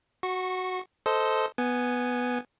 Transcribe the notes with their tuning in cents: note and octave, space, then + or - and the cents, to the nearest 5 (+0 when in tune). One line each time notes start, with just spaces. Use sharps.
F#4 +0 C#6 -20
A4 +0 C5 -10 D#5 +15
B3 +0 G#5 +0